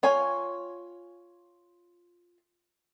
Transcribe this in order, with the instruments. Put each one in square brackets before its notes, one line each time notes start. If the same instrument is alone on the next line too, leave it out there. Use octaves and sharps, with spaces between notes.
[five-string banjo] F4 C#5 G#5